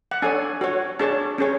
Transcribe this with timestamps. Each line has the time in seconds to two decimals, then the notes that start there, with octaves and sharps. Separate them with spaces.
0.11 F#5
0.22 D4 A4 C#5 G#5
0.61 F#4 C#5
0.99 D4 G#4 C#5 A5
1.38 C#4 G#4 C#5